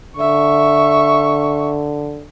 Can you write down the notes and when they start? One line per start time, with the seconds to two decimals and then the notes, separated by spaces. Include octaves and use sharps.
0.17 D3 E5 C#6